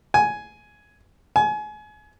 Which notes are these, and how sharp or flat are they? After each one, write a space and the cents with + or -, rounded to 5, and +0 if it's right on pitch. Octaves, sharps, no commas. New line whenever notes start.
G#5 +10
G#5 +30